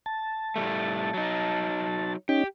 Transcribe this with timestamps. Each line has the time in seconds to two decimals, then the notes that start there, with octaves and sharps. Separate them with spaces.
0.06 A5
0.56 A2 G3 A3
1.14 F#3 D#4
2.29 C#4 D#4 G4